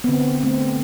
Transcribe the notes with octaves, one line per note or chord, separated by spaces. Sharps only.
B3
D3 C4
A3 C4